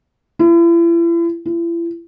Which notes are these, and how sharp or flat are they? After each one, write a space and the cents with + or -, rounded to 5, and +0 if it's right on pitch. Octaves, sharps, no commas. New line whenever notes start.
E4 +40
E4 +40